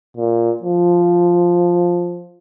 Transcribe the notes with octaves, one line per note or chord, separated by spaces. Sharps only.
A#2
F3